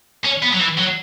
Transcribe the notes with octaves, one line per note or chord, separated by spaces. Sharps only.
C#4
B3
F#3
E3
F#3